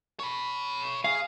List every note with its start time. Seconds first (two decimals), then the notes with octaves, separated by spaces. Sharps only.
0.20 C#5 B5
1.04 G#4 F5